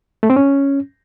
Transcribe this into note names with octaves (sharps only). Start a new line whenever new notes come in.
A3
C4
C#4